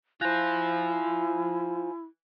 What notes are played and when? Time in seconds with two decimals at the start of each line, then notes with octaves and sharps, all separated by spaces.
0.21 E4 F4 C5 G#5 F#6 G6 A#6